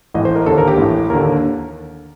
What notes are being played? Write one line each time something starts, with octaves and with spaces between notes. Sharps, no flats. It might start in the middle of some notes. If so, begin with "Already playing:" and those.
A1 A2 D#5
C5
A#4
D#2 D3 A4
A#4
G4
A1 A2
D#2 D3 A#4